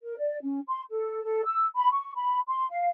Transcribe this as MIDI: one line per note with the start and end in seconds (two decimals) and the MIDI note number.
0.03 0.19 70
0.19 0.37 74
0.43 0.60 61
0.67 0.82 84
0.90 1.21 69
1.23 1.41 69
1.45 1.65 88
1.76 1.88 83
1.91 2.13 85
2.15 2.40 83
2.48 2.65 84
2.70 2.89 77